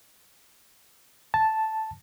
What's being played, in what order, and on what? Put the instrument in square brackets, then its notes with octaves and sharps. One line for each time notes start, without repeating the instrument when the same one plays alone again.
[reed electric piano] A5